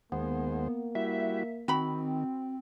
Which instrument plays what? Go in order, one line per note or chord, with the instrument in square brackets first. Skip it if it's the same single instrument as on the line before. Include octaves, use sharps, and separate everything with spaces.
[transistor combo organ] D#2 G#3 C5 [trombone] A#3 [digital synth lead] B3
[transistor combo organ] G3 E4 F#4 [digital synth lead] E5
[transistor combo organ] D#3 [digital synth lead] C4 [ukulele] F#4 B5